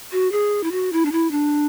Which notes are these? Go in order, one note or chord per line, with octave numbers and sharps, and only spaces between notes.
F#4
G#4
E4
F#4
E4
D4
E4
D4